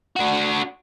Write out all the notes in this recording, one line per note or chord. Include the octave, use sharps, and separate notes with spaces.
D4 F#4